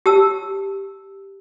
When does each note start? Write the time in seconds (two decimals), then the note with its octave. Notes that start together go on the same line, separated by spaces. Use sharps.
0.06 G4 A5 E6